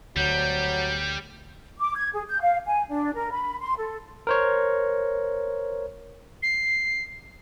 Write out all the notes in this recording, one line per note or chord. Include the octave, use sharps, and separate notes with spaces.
D2 F#3 G3 G6
D6
G#6
G#4
G6
F5
G#5
D4
A#4
B5
C6
A4
A#4 C5 C#5
C7